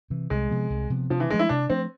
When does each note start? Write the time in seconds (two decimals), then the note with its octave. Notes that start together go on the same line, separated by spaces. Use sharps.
0.10 C3 E3
0.30 C2 G#3
0.50 C3 F3 B3
0.70 C2
0.90 C3 F3 B3
1.10 C3 F3
1.20 E3
1.30 F3 G#3 A3 D4
1.39 E4
1.49 C3 D4
1.69 F3 A3 C4 D4